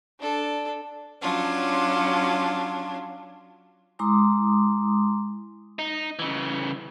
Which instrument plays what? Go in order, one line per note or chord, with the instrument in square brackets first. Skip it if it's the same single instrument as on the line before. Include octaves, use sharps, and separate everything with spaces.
[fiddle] D4 A4
[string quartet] F#3 C#4 D4 F4
[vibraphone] G#3 E4 A#5 C6 D6 D#6
[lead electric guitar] D#4
C#3 E3